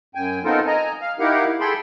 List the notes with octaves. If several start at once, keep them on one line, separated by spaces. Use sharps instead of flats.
F#2 G5 G#5
B3 C4 D#4 F4 A4 A#4
D#5 G#5 A#5
F5 F6
D#4 E4 G4 A#4 F5 F#5
G#4 A4 G5 B5 C6